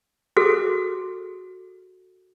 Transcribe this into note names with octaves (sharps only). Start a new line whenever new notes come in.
F#4 G#4 A4